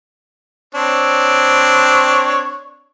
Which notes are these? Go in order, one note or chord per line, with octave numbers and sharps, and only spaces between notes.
C4 D4 C#5